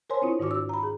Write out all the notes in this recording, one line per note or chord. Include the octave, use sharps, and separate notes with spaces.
A#4 C5 C#5 G#5 C6
C4 D4 E4 F4
G#2 D#3 D4 F#4 D6
E6
A#5 B5
G#4